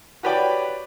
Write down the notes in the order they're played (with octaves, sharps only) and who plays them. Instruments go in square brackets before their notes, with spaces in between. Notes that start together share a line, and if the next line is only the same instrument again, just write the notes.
[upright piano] F#4 G4 B4 C#5 D5 G5